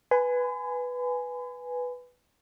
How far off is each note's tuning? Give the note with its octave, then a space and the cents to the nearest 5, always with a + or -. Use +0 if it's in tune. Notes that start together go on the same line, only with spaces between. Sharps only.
B4 +0 G#5 +0 B5 +45